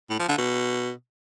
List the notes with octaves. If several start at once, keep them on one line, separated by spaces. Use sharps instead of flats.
A2
F3
D3
B2